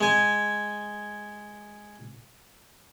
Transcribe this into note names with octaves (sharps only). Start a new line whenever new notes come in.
G#3 G#5